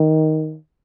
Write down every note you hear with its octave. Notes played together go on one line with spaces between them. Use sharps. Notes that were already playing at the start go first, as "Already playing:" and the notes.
Already playing: D#3